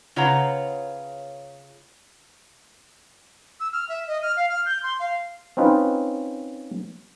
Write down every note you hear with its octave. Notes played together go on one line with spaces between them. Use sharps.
C#3 F4 B4 C#5 F#5 A#5
E6
F6
E5
D#5
F6
F5
F6
G6
C6
F5
C4 C#4 D#4 F4 B4